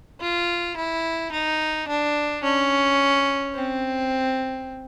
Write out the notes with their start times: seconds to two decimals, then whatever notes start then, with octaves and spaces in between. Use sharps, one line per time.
0.21 F4
0.77 E4
1.32 D#4
1.88 D4
2.44 C#4
3.54 C4